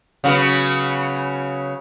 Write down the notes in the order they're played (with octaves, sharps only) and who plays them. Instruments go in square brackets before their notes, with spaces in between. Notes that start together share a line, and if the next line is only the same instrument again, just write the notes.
[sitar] C#3 F#3 B3